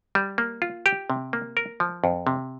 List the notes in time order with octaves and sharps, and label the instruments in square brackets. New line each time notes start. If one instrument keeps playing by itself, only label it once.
[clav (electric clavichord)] G3
A#3
F4
G4
C3
A#3
A#4
F3
F2
C3